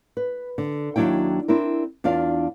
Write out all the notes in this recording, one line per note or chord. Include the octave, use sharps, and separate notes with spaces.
B4
D3
D#2 F#3 D4 E4 G5
C4 D4 E4 A#4
E2 D4 F4 D5 F5